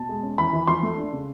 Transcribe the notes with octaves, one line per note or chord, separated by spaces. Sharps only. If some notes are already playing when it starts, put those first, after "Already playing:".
Already playing: B2 A5
G#3
C#4
E3 B5
E3
F3 C6
A3
D4
C#3